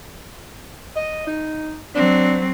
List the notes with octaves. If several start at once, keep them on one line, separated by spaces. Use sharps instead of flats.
D#5
D#4
F#3 C4 D4